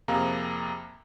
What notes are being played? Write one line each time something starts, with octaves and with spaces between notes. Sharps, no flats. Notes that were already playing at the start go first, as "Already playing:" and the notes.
F2 C3 A#3 G#4 F5 A#5